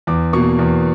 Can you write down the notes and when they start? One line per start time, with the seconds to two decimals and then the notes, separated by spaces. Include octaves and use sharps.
0.07 E2 D6
0.33 B2 A#3 C#6
0.59 E2